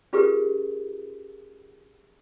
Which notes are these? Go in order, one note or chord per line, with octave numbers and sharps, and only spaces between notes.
C#4 F4 G4 G#4 A#4 B4